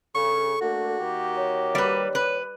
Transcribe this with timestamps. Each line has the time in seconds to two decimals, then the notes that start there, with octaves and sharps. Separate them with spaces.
0.15 G2 C#3 A4 C#6
0.61 A3 A#3 D4 F#4
1.00 D#3 A#3 G4
1.36 C#5
1.75 G3 B4
2.15 B4